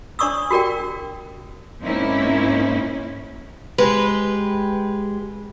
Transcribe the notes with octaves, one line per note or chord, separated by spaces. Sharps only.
D4 C#5 D5 C#6 D#6 E6
F#4 G4 A#4 D5 G5
G#2 A#3 C4 C#4 D#4 E4
G#3 G4 B4